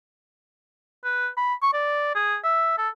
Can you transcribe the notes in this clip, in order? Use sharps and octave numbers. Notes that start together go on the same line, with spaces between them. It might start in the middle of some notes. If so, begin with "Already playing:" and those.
B4
B5
C#6
D5
G#4
E5
A4